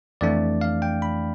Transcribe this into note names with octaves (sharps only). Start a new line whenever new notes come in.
F2 E3 A3 D4 D5
F5
G5
B5